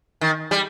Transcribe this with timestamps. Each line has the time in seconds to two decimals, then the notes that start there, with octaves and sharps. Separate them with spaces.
0.21 D#3
0.51 G3